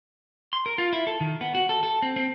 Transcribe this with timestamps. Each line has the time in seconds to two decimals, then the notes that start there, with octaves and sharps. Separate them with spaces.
0.53 C6
0.66 A#4
0.78 F4
0.93 E4
1.07 A4
1.21 D#3
1.41 B3
1.55 F#4
1.69 A4
1.83 A4
2.02 C4
2.16 C4